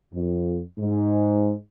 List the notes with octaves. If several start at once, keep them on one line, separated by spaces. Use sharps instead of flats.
F2
G#2